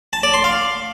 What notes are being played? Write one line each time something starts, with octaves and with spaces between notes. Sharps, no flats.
A5
D5
C6
F5